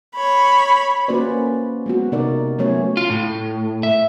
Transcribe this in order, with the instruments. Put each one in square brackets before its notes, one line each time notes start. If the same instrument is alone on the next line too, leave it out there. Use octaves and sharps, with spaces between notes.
[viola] C#5 B5
[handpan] A#3 C#4 F#4 B4 C5 D5
G#3 B3 F#4
C3 D#4 A#4 D5
F#3 A3 B3 C#4 C#5
[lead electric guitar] F4
A2
E5